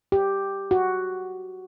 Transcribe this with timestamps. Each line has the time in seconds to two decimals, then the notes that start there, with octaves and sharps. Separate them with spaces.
0.12 G4
0.71 F#4